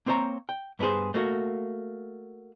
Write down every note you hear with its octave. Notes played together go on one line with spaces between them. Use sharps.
A#3 C4 C5 C#5 A#5
G5
G2 B3 D4 G#4 C5
A3 A#3 F#4